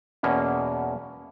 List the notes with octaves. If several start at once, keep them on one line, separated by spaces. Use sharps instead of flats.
E2 B2 A#3 C#4